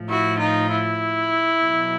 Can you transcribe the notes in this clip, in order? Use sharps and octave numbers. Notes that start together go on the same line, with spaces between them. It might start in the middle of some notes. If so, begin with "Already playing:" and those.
Already playing: A2 F3
E4 F#4
D#4 F4
E4
B2 F#3